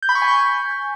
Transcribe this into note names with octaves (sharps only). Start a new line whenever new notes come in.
G6
B5
C#6
G#5
G6